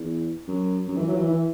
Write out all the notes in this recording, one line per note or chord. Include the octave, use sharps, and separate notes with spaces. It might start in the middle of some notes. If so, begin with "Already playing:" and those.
Already playing: E2
F#2
F#2
E3
F#3
E3
E3